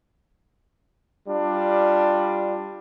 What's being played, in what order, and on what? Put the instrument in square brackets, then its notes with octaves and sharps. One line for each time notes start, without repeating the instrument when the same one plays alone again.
[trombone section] G3 D4 F4